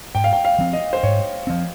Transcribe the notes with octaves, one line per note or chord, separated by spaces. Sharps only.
G#2 G5
F5
G5
F5
F3 C4
D#5
C5
G#2 C#5
F3 C4